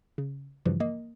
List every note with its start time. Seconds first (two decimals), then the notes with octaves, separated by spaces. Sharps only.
0.18 C#3
0.65 G2 C#3 E3 F3 G3
0.80 A#3 D#5